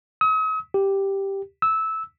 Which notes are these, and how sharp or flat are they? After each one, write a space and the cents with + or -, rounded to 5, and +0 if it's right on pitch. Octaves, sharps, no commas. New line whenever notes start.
D#6 +45
G4 +0
E6 -15